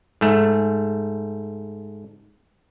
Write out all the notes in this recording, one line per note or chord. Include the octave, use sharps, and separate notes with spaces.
G#2 A3